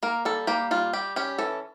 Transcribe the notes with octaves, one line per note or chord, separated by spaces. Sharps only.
A#3 A#4
G3 A4
A#3 G4
G3 F4
G3 G4
C#4 G4
E3 A4